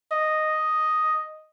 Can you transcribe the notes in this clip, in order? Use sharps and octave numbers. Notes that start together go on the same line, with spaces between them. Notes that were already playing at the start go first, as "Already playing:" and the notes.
D#5